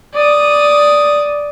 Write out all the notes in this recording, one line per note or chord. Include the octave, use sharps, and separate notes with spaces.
D5 D#6